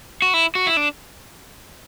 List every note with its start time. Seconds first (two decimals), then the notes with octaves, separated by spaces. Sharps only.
0.22 F#4
0.34 E4
0.55 F#4
0.66 E4
0.77 D4